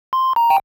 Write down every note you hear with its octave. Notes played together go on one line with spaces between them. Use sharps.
C6
A#5
G5